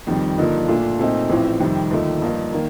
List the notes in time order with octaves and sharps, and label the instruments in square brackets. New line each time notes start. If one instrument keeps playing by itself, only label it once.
[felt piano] F2 D#3 G3
G2 D3 F3 A#3 D#4
A#2 A3 D4 F4
A#2 A3 C4 D#4
A1 A2 F3 C4
F2 C3 D#3 G3
D#2 D3 F3 A3 D#4
G2 F3 A#3 D#4
D#3 A#3